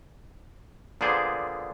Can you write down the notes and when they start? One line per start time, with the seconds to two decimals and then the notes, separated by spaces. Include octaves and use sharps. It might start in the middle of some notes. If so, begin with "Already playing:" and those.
1.01 A#2 D3 B3 G#4 C5 D5